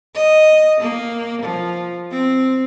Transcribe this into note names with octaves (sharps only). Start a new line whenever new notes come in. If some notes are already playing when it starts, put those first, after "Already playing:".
D#5
A#3
F3
C4